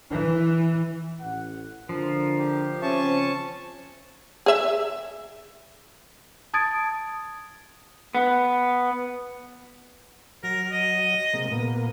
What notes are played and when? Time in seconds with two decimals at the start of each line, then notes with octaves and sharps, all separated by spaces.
0.11 E3
1.21 A1 F#5
1.89 D3 F3 A#4
2.38 G4
2.82 C#3 C4 C#4 E5 A5 C#6
4.46 G#4 E5
6.54 A5 D#6 G#6 A6 D7
8.15 B3
10.44 F#3 A#4
10.71 D#5
11.33 C3 G#3 A#3
11.51 A#2 A#3 B3